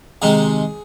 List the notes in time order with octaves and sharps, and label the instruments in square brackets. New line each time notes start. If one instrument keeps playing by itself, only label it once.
[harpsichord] C3 D#3 G#3 G#4